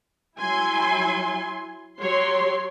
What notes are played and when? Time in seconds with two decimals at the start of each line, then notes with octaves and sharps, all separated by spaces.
0.39 F#3 E4 G#5 C6
2.01 F#3 G4 C#5 C6